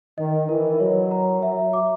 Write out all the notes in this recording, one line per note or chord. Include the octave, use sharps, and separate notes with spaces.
D#3 D#5
E3 A#4
F#3 C#5
A#5
F#3 E5
D6